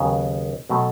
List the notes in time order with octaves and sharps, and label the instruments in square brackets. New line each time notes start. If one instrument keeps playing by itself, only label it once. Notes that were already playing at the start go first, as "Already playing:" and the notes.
Already playing: [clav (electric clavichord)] D#2 C#3 F#3 B3
B2 F#3 A3